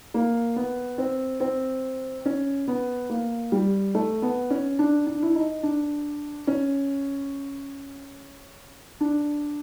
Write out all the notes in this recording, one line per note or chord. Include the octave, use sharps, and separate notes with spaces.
A#3
B3
C4
C4
C#4
B3
A#3
G3
A3
B3
C#4
D4
D4
E4
D#4
D4
C#4
D4